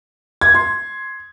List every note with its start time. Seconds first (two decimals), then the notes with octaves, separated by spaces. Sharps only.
0.41 G#6
0.55 C6